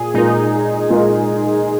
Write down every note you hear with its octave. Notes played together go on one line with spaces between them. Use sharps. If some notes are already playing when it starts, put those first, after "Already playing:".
Already playing: A#2 G#4
A#2 G#3 D#4 F4 A#4
A#2 G#3 F4 A#4